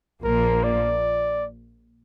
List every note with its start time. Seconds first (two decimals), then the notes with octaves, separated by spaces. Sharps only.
0.23 A#1 A#2 F3 A#3 A#4
0.63 D5